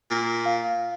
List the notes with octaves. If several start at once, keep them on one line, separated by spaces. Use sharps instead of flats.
A#2
F5